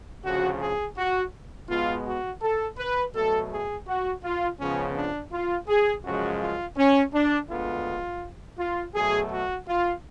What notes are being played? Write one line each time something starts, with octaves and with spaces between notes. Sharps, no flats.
D2 C#3 F3 F#4
G#4
F#4
B2 G#3 B3 F4
F#4
A4
B4
B2 F#3 A3 A4
G#4
F#4
F4
C#2 C#3 F3 B3 C#4
D4
F4
G#4
F#2 C#3 F3 G#3 F#4
F4
C#4
D4
D2 D3 G#3 B3 F4
F4
B2 F#3 A3 G#4
F#4
F4